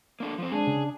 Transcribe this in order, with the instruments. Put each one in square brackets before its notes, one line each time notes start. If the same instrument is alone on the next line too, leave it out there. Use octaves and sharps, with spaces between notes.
[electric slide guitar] A#3 D4 A4
F3 C4
[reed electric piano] G#3 [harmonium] D4 [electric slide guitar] G#4
[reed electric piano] C#3